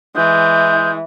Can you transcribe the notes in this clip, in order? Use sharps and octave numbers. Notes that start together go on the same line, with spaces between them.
E3 G#3 G6